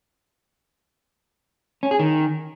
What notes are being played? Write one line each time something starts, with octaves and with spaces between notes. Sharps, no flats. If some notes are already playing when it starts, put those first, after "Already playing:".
C#4
G#4
D#3